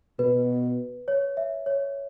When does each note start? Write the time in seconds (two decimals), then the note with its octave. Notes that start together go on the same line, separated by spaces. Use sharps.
0.19 B2 B4
1.08 C#5
1.37 E5
1.66 C#5